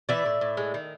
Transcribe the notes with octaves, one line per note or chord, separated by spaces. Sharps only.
E3 D5 E5
A2
A2
G#3
D#3